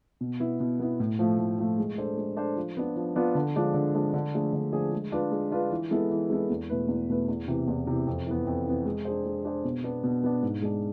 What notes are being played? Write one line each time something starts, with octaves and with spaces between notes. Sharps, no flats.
B2
B3 E4
B2
B3 E4
A2
F3 A3
A2
F3 A3
G#3
D4 A4 C5
G#3
D4 A4 C5
F3
B3 D4 F4
F3
B3 D4 F4
D3
F3 G#3 D4 F4
D3
F3 G#3 D4 F4
D3
F3 A3 D4 G#4
D3
F3 A3 D4 G#4
G#3
D4 F4 B4
G#3
D4 F4 B4
E3
G#3 B3 E4 A4
E3
G#3 B3 E4 A4
E2
B2 A3 E4 B4
E2
B2 A3 E4 B4
E2
C3 E3
E2
C3 E3
F2
E3 B3
F2
E3 B3
G#3
D4 G#4 C5
G#3
D4 G#4 C5
B2
B3 D4
B2
B3 D4
G#2
G#3 D4